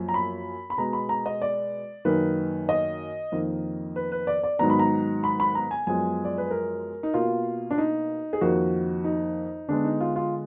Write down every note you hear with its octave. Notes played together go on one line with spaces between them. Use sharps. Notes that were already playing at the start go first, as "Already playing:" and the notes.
Already playing: F#2 F3 A#3
A#5
B5
B5
B2 G#3 B3 A#5
B5
A#5
D#5
D5
F#2 D#3 A#3 B4
D#5
F2 D#3 A#3
B4
B4
D5
D5
G#2 D#3 F#3 B3 A#5
B5
A#5
B5
B5
A#5
G#5
F#2 F3 G#3 B3 G#5
D5
B4
A#4
D#4
B2 A#3 F4
D4
D#4
G#4
F2 D#3 A#3 F#4
D#4
D3 G#3 B3 D4
D#4
F4
F4